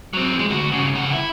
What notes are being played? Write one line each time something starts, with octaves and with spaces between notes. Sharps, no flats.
F#3 C4
F3 G#3
D2 F#4
G2 C#3
C#3 F#5
E4